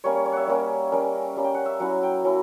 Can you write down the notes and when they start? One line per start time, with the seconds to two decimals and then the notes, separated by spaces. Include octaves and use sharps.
0.04 G3 A#3 C#4 C#5
0.15 C#5
0.26 C#5
0.32 E5 F#5
0.48 G3 A#3 C#4
0.92 G3 A#3 C#4
1.37 G3 A#3 C#4
1.44 G5
1.54 F#5
1.65 E5
1.80 F#3 C#4 E4 F#5
2.03 G5
2.24 F#3 C#4 E4